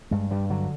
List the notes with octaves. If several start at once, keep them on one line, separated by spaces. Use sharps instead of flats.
G2 G#3
G2 G3
D3 F#3